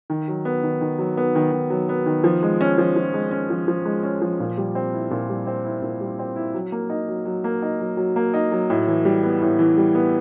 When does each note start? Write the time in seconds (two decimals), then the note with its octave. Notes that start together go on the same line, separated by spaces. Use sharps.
0.10 D#3
0.28 F#3
0.45 B3
0.63 D#3
0.81 D#3
0.99 F#3
1.17 B3
1.35 D#3
1.52 D#3
1.70 F#3
1.89 B3
2.06 D#3
2.24 F3
2.43 G#3
2.61 C#4
2.78 F3
2.96 F3
3.14 G#3
3.31 C#4
3.50 F3
3.68 F3
3.85 G#3
4.03 C#4
4.22 F3
4.40 A#2
4.58 G3
4.75 C4
4.94 E4
5.11 A#2
5.30 G3
5.47 C4
5.65 E4
5.82 A#2
6.01 G3
6.19 C4
6.36 E4
6.54 F#3
6.72 A#3
6.90 D#4
7.09 F#3
7.25 F#3
7.44 A#3
7.62 D#4
7.80 F#3
7.97 F#3
8.16 A#3
8.34 D#4
8.52 F#3
8.70 A2
8.88 E3
9.05 G3
9.23 B3
9.42 A2
9.59 E3
9.77 G3
9.95 B3